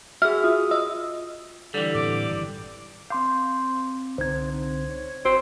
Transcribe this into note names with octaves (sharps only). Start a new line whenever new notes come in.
F#4 G#4 E5 F6
F4 D#6
D#5 E6
D3 E3 G3
A2 C4 D6
G1 F#2 D#3
C4 F5 C6 D6 G6
C2 D3 C4 D#4 C5 G#6
C#5
G1 C4 F#4 D#5